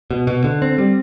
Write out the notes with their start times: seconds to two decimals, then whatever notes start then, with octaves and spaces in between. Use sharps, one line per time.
0.11 B2
0.27 B2
0.44 D3
0.62 C4
0.78 G3